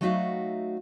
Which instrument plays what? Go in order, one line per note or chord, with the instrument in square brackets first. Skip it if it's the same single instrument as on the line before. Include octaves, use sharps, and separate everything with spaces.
[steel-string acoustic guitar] F#3 A3 D#4 F#4 E5 F5